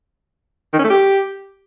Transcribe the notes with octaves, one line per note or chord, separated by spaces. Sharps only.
D#3
C#4
A3
G4